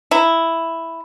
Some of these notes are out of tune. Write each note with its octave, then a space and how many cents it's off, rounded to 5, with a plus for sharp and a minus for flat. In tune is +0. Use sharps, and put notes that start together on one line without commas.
E4 +0 A#5 +0